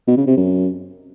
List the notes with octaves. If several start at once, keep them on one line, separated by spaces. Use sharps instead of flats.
B2
C#3
C3
F#2